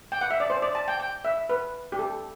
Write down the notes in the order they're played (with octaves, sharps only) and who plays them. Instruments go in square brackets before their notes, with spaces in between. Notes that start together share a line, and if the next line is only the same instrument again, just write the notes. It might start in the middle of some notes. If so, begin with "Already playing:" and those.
[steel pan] G5
F#5
E5
D5
C5
D5
A5
G5
G5
E5
B4
G4
A4